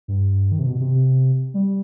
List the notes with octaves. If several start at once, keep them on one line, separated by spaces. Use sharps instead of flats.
G2
D#3
C3
B2
C3
G3